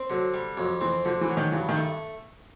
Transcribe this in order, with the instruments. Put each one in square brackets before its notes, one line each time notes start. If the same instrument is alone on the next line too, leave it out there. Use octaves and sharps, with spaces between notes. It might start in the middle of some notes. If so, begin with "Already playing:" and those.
Already playing: [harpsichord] C4
[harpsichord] D3 [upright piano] F#3
[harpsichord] G3
[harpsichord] F2 [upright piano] F#3
[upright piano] E3 [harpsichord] C4
[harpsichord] D3 [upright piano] F3
[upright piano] E3
[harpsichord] F#3
[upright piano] D#3
[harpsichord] G2 [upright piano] E3
[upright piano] D#3
[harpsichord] A3